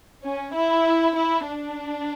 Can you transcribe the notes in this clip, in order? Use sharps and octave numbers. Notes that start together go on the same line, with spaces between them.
C#4
E4
E4
D4